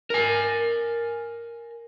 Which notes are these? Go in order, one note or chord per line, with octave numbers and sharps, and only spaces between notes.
A#4 G#5